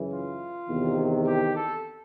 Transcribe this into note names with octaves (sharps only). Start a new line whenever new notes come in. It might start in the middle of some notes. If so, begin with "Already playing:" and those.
Already playing: F#2 C#3 E3
F4
E2 C3 D#3
G4
A4